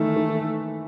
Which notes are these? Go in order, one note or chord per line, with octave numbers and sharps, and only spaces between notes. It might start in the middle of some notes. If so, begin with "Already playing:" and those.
Already playing: D#3 E3 A3
D#3